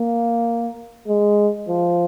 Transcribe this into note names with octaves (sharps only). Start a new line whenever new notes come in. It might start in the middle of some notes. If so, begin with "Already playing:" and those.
Already playing: A#3
G#3
F3